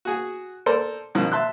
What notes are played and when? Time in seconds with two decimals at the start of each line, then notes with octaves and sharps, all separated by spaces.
0.05 F#4 G#4
0.66 A4 A#4 C5 D5
1.15 F#2 B2 D#3 F3
1.32 E5 A5 C6 E6 F#6